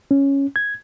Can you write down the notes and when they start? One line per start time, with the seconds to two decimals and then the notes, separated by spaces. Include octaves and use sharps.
0.11 C#4
0.56 G#6